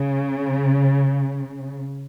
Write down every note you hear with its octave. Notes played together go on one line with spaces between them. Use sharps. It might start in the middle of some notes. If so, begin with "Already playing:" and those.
Already playing: C#3